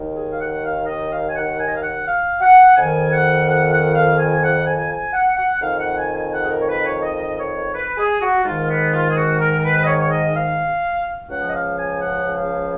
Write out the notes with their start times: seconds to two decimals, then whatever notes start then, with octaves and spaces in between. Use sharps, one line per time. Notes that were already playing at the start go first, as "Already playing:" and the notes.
Already playing: D#2 D#3
0.15 G#4
0.30 F5
0.39 F#5
0.63 F5
0.86 D#5
1.10 F5
1.27 G#5
1.34 F#5
1.57 G#5
1.67 D#5
1.74 F5
1.81 F#5
2.05 F5
2.41 F#5
2.76 F2 D#3 G#5
3.12 F#5
3.47 F#5
3.70 F#5
3.94 F5
4.18 G#5
4.42 F#5
4.65 G#5
4.90 G#5
5.13 F#5
5.37 F#5
5.60 F2 D#3 F5
5.78 F#5
5.96 G#5
6.14 G#5
6.31 F#5
6.42 G#4
6.49 A#4
6.59 C#5
6.67 B4
6.84 C#5
7.02 D#5
7.38 C#5
7.73 B4
7.97 G#4
8.21 F#4
8.44 G#2 D#3 F4
8.68 B3
8.92 F4
9.09 G#4
9.15 F#4
9.39 A#4
9.58 A#4
9.63 B4
9.82 D#5
9.86 C#5
9.99 C#5
10.10 D#5
10.34 F5
11.28 C#2 C#3 F3 F#5
11.48 D#5
11.53 F5
11.76 G#5
11.99 F#5
12.35 F5